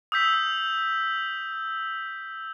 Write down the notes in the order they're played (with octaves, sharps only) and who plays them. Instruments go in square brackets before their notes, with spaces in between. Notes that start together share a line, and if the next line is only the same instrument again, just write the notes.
[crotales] D#6 E6 G6 B6